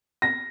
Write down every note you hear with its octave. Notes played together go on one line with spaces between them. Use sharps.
A#6